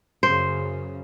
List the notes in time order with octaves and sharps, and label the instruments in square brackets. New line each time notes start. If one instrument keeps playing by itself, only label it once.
[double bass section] F#2 C#3 [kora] C5